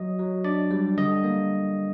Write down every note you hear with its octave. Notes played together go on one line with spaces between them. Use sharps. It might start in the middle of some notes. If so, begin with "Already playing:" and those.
Already playing: F#3 D#5
F#3
D4 D5
G3
D3 D#5
A#3